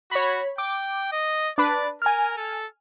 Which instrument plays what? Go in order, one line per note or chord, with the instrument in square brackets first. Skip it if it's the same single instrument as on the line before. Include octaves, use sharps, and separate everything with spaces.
[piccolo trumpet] F#4 [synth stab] C#5 B5
[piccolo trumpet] G5 [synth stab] D6
[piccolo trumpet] D#5
[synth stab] D4 B4 [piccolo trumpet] D5
[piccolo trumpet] A#4 [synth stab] G#5 F6
[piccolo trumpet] A4